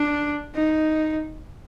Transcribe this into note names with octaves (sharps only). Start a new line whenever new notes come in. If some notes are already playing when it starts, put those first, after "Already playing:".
Already playing: D4
D#4